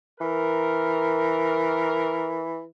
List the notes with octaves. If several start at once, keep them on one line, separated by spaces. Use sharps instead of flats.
E3 A#4